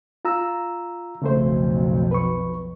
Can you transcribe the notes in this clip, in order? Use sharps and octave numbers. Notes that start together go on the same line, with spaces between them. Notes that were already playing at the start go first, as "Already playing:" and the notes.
F4 A#5 E6
B1 F2 C#3 A3 C5
B4 C#6